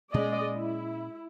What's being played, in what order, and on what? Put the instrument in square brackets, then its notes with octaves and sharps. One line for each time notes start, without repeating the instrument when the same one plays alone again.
[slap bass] A#2 C#4 [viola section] G#3 D5 D#5
[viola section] E4